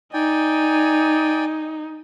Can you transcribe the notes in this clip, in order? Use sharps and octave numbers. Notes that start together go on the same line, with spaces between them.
D#4 D5 G5 G#5